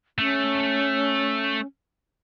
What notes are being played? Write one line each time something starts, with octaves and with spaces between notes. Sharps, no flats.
A3 C#4